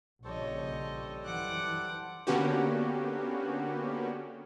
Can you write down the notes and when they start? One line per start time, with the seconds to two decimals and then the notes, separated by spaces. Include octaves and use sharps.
0.24 A#1 C#3 F3 G3 A4 C5 C#5 D#5
1.25 F#2 E3 F#5 D6
2.27 D3 A#3 B3 C#4 F#4 G4